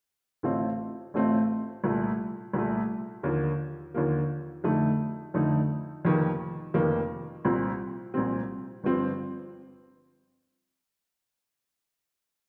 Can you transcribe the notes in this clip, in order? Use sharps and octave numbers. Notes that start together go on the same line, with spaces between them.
A1 A2 A3 C4 F4
A1 A2 A3 C4 F4
C2 A#2 A3
C2 A#2 A3
D#2 D3 F3 A#3
D#2 D3 F3 A#3
F2 D3 A3 D#4
F2 D3 A3 D#4
F1 F2 D#3 A#3
F1 F2 D#3 A#3
C2 A#2 F3 C4
C2 A#2 F3 C4
G1 G2 F3 C4